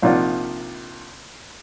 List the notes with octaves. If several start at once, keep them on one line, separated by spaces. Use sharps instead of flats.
A#1 C3 D#4 F4 D5 F#5